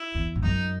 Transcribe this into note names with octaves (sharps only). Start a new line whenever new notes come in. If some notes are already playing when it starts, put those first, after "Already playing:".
Already playing: E4
E2
G#2
F#2 D#4